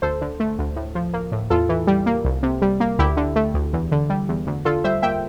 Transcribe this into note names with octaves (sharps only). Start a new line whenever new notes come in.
D2 A4 C5
D3
A3
D2
A2
F3
A#3
A2
E2 F4 A4
E3
G3
A#3
C2
C3
G3
A#3
D2 E4 G4
D3
A3
D2
E2
D3
G3
E2
D2
D3 F4 A4
G3 C5 E5
A#3 E5 G5